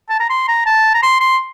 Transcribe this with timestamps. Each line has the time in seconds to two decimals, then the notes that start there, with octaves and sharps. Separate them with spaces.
0.09 A5
0.20 A#5
0.30 C6
0.48 A#5
0.66 A5
0.94 A#5
1.03 C6
1.21 C6